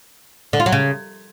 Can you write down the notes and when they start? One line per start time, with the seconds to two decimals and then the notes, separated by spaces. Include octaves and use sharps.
0.53 D3
0.60 F4
0.66 F#3
0.72 C#3